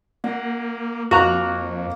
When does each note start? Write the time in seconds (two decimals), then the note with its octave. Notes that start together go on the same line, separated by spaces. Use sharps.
0.24 A#3 F#5
1.11 F2 A#3 F#4 A#5 F#6